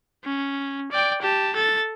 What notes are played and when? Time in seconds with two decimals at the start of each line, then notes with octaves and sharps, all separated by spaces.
0.24 C#4
0.92 D5 G5
1.22 G4 A5
1.55 A4 A6